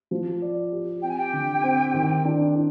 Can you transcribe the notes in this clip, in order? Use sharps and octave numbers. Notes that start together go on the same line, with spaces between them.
F3
D5
G4
C4 G5
G#5
G4 G5
D3
C4
D#3
D4
D4